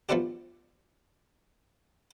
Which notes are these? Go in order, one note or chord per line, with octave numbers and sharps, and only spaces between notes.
F3 A3 B3 C4 D4 G4